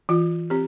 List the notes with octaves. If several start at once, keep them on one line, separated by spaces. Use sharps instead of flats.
E3 F4
C4 G4